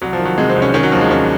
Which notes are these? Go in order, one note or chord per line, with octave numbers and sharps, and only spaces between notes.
C2 F#3
F3
D#3
F#3
C3 G#3
C4
C2
C#4
D#3 C#4
F#3
D#2 F3
G#3
D#2 C#4